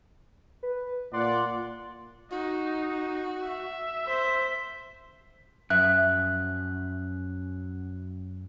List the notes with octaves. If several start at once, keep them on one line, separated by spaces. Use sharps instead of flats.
B4
A#2 D5 F#5 C6
D#4 F#4
E5
C5 B6
F#2 F3 E5 F#6